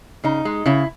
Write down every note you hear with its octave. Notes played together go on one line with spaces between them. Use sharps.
C#3 D#4
G#3
C#3 E4